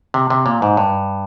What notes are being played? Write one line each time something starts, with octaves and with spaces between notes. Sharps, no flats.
C3
C3
A#2
G#2
G2